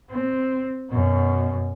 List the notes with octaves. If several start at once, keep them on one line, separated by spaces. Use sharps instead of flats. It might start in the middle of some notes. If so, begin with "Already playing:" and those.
C4
F#2 B2